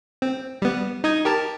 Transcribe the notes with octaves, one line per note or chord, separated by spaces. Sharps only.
C4
G3 B3
D#4 D#6 G#6
G4 A#4 A5